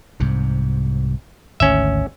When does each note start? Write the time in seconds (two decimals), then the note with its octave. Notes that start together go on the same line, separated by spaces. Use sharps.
0.20 C2 G#2 C3
1.60 G#1 D2 C#4 E5